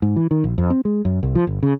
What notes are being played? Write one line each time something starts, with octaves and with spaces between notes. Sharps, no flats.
G#2
E3
D#3
A#1
F2
C4
G#3
F#2
C2
F3
G1
C#3